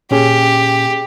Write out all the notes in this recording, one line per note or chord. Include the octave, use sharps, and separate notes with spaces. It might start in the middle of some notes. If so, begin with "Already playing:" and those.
A#2 C#4 G4 G#4